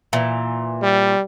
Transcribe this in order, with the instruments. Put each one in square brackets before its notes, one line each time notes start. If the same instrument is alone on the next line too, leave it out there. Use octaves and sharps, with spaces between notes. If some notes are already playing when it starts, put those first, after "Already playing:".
[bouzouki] A#2 E3
[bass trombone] G3